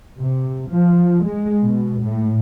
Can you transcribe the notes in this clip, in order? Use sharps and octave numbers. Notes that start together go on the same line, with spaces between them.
C3
F3
G#3
B2
A2